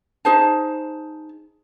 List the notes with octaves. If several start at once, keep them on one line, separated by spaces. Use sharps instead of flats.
D#4 G#4 C5 A5